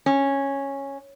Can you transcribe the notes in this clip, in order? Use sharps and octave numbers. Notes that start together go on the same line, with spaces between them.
C#4